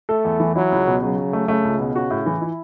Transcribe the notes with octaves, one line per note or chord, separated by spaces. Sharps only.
A3 A4
E2
E3
F#3 E4
C#2
B2
C#3 F#3
F#3
A3
C#3 A3
C#2
B2
C#3 F#4
A2
E3
E4